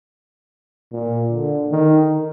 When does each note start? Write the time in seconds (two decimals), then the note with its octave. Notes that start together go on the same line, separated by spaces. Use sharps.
0.92 A#2
1.31 D3
1.71 D#3